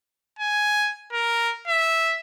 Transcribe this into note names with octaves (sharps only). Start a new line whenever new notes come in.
G#5
A#4
E5